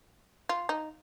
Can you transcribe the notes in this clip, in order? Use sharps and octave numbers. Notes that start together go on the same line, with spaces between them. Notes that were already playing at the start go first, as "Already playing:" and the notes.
F4
D#4